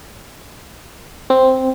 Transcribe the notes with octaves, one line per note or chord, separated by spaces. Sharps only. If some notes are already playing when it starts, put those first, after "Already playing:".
C4